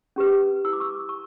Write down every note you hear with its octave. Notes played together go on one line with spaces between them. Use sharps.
C#4 G4 B4
E4 B4 E6
D6
C#6 E6
C#6